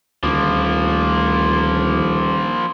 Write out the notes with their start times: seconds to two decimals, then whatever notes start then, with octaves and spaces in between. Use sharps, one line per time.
0.23 D#1 D2 F3 A#3